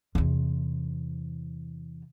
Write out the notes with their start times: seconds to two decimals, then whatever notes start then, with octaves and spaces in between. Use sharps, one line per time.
0.15 E2 C3